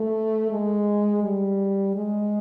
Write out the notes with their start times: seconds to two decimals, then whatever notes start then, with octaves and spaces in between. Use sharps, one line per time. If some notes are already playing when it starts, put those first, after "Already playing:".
Already playing: A3
0.51 G#3
1.23 G3
1.96 G#3